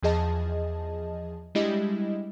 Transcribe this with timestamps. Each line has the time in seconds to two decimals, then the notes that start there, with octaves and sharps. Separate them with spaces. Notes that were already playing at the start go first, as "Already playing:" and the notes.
0.02 E2 F3 G#4 D#5 A5
1.55 G3 G#3 D4 E4 G4 D#5